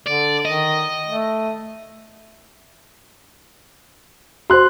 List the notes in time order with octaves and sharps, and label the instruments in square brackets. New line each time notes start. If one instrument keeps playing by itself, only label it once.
[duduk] D3 [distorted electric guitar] D5
[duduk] D#3 [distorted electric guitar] D#5
[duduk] A3
[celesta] F#4 C5 [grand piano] C6 F#6